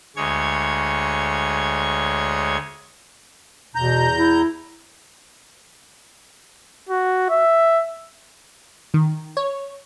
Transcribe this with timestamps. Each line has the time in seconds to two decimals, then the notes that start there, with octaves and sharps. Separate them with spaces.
0.16 D2 G#3 C#5 G#6
3.75 E2 B2 A#5 G6
4.17 E4
6.89 F#4
7.30 E5
8.94 D#3
9.37 C#5